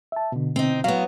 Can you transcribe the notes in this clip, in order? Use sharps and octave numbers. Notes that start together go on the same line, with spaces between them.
E5 A5
B2 D3
C4 D#4
F#3 B3 F5